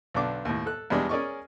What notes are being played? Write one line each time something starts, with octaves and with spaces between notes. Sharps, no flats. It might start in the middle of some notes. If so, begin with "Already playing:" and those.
B1 D3 D4 D6
D#2 A2
A4 F#6
E2 G3 G#3 D4
C#4 G#4 A#4 D5 D#5 C#6